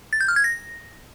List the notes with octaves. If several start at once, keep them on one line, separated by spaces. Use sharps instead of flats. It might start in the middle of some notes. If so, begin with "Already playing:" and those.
A6
G6
F6
G#6
A#6